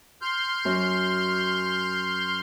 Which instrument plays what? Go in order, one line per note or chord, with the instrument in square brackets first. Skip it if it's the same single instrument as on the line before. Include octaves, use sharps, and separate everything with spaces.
[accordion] C6 F6 G6
[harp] F#2